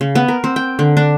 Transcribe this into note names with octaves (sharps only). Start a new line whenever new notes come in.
C#3
B3
A#4
C4
G5
D3
D4